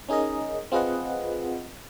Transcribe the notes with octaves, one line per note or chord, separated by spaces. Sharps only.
C#4 D#4 G#4 A#4 D#5
C4 F4 G#4 B4 D#5 F#5